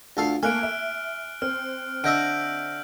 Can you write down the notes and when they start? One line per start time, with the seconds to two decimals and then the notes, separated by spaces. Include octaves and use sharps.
0.17 D2 F4 A4 F5
0.43 A3 A#3 G#5 F6 F#6 D7
0.63 E5
1.42 C4 F6
2.04 D3 D#5 E5 E6 G6 D7